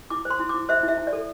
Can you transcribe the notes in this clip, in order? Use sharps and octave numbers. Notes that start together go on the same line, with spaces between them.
E4 D6
C5
C6
E4
D6
E4
C5 E5
E4 E5
E4
D5
A4